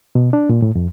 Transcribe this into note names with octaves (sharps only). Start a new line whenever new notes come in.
B2
D4
A#2
A2
F2